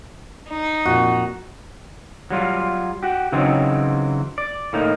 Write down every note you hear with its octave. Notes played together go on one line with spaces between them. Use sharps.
D#4
F2 A#2 F#4
F#3 G3 F4
F#4 G4
C#3 E3 F#3 C4 D#4
D5
A2 A#3 D#4